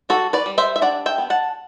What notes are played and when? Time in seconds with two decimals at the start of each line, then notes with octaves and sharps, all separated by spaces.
0.09 G3 F#4 A4
0.33 B4 D5
0.46 G3
0.58 C5 E5
0.76 E5
0.81 D4 D5 F#5
1.06 E5 G5
1.18 B3
1.30 F#5 A5